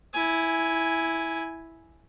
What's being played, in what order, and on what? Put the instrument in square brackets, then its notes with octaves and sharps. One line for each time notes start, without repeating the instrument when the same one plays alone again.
[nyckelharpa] E4 G#5